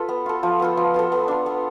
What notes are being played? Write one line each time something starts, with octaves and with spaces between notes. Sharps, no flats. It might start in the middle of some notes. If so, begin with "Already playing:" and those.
Already playing: F4 A4 B4
B3
F4 A4
F3
B3 F4 A4
F3
B3 F4 A4
B3
D4 F4
B3